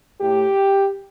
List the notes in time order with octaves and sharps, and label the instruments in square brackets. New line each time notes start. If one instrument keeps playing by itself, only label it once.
[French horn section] A2 A3 G4